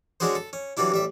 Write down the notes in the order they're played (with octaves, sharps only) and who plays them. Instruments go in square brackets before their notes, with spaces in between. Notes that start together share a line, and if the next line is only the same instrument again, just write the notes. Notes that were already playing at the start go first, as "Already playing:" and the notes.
[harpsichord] G#3 C#4 D4 F#4 G#4 C5
A4
C#4
E3 F#3 G3 D4 E4
A1 G3 E5